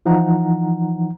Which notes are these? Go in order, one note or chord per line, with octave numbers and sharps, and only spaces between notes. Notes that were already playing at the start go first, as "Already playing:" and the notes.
E3 F3 D#4 F#5 A#5